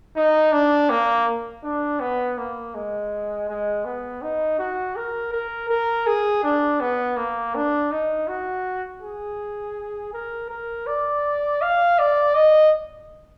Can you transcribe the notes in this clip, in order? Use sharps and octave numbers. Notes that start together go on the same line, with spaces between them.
D#4
D4
A#3
D4
B3
A#3
G#3
G#3
B3
D#4
F#4
A#4
A#4
A#4
G#4
D4
B3
A#3
D4
D#4
F#4
G#4
A#4
A#4
D5
F5
D5
D#5